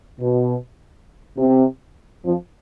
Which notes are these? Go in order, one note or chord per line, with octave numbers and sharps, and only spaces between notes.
B2
C3
F2 F3